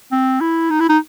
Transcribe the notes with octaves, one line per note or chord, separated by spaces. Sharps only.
C4
E4
D#4
E4
D#4